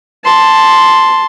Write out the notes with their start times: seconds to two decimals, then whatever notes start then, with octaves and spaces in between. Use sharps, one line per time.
0.25 A5 C6